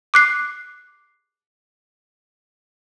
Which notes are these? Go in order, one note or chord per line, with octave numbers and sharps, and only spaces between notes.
D6 F#6 C7